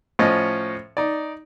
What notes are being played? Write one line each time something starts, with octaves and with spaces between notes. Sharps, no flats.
A2 F3 C#4 D#5
D#4 D5